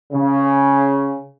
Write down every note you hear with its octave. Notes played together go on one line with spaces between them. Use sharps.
C#3